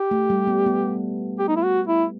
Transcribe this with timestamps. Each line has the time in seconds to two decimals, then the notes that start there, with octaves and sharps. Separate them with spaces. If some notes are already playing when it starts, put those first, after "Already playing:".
Already playing: G4
0.11 A3
0.30 G3
0.47 B3
0.66 B3
1.39 G4
1.48 D#4
1.56 E4
1.64 F#4
1.87 E4